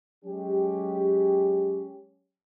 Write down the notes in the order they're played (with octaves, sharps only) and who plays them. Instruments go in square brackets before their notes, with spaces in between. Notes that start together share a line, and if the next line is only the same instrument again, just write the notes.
[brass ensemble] F#3 G#3 C#4 G4